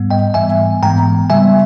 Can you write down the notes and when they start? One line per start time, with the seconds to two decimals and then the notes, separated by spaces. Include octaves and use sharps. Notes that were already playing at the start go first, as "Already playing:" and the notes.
Already playing: G#2 G3 B3
0.11 D#5 G5
0.34 G#2 E3 G3 B3 E5 G#5
0.83 G#2 E3 G#3 B3 G5 A#5
1.30 C#3 G3 B3 E5 G#5